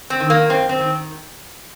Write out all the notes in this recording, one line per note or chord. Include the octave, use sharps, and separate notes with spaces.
C4
D#3
A#3
F#2 C4
C4
D#3